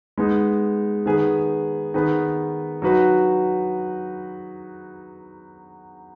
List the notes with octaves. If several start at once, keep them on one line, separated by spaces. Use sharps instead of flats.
G#3 B3 D#4
D#3 B3 G#4 B4
D#3 B3 G#4 B4
F#3 D#4 F#4 B4